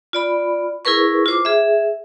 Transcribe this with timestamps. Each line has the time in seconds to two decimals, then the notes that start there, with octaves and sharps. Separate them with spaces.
0.13 F4 D5 B5
0.85 E4 G#4 A#4 B4 C#6
1.26 F4 C5 D6
1.45 G#4 E5